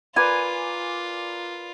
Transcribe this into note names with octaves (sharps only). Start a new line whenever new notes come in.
F4 A#4 B4 D5 G#5